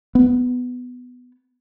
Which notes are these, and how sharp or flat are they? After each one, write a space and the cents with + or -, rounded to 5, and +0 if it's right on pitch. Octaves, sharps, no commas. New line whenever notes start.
B3 +10